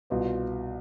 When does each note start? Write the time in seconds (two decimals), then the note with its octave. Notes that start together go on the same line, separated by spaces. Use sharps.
0.10 C2 B2 B3 F4